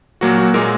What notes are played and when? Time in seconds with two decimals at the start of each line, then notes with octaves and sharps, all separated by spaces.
0.21 A#2 F#3 A#3 F#4
0.38 F#4
0.54 A#2 G#3 A#4